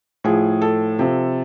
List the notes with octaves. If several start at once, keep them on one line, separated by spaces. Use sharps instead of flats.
A2 F3 G#4
A4
C3 F3